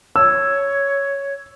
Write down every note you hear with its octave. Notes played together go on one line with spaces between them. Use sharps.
C#5 E6